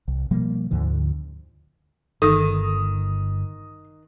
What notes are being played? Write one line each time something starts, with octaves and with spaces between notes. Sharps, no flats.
C2
B2 F3 G3 A#3
D2 G#2 D3 F3
G1 D#3 A4 D#6